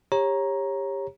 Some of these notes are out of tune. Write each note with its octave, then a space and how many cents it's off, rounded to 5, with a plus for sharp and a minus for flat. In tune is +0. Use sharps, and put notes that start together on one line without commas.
G4 +25 C#5 -20 A#5 +10